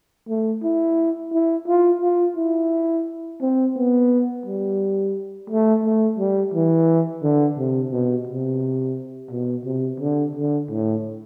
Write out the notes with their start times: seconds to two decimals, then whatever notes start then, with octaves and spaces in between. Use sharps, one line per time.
0.29 A3
0.63 E4
1.33 E4
1.67 F4
2.02 F4
2.36 E4
3.41 C4
3.76 B3
4.46 G3
5.50 A3
5.85 A3
6.18 G3
6.54 E3
7.23 D3
7.58 C3
7.92 B2
8.27 C3
9.31 B2
9.65 C3
10.00 D3
10.36 D3
10.71 A2